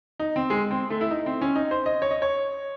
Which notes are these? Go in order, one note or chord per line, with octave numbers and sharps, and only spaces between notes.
D#4
C4
G#3
C4
A3
E4
D#4
C4
C#4
D#4
C5
D#5
C#5
D#5
C#5